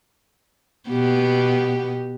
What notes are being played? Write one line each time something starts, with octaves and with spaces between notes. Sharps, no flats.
B2 B3 G4